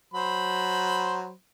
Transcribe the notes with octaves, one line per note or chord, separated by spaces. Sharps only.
F#3 C5 B5